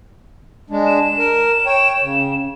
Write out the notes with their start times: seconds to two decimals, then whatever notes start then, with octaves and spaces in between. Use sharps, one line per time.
0.70 G#3 D4
0.87 E7
1.19 A#4
1.66 C#5 G5
2.02 C#3